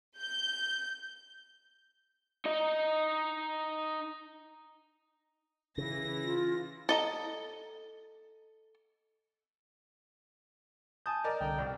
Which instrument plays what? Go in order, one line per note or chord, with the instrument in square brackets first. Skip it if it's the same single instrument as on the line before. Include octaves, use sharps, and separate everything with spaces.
[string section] G6
[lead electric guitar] D#4 D#5
[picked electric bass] C#3 [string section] E3 A#6 [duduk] E4
[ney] F4
[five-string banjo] A4 D#5 A#5
[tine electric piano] G#5 A5 G6 [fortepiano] D#6
[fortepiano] A#4 D5 D#5
[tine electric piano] C2 D3 A#5 [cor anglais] G5
[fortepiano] C2 [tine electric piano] D5